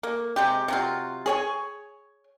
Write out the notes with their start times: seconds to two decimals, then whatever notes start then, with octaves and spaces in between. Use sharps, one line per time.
0.03 A#3
0.36 C3 G#3 G4
0.68 C3 F#3 F4
1.26 G#4 C#5 G#5